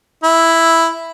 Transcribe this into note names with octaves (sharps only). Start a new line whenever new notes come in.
E4